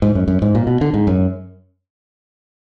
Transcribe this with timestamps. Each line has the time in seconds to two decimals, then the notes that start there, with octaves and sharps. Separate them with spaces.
0.02 G#2
0.15 F#2
0.28 F#2
0.42 G#2
0.55 A#2
0.67 B2
0.81 D3
0.94 G#2
1.07 F#2